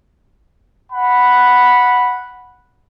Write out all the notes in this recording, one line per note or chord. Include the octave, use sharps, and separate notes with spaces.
F#5 B5